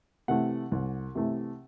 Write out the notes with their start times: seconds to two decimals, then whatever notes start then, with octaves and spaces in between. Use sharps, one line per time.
0.28 C3 E3 A3 F#5
0.72 C2
1.15 C3 E3 A3